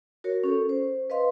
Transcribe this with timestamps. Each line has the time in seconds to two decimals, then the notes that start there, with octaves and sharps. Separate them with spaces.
0.24 F#4 A#4 C#5
0.44 C#4 A4
0.69 C5
1.10 B4 D#5 F5 C6